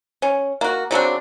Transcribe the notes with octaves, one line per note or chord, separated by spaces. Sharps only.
C#4
A#3 F#4
C#3 F#3 C4 D4